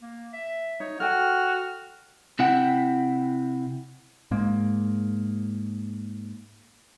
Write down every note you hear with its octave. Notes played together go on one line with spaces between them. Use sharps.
A#3
E5
D#4 C#5
F#4 A4 G5 F6
C3 E4 F#5 G5
G#2 G#3 A#3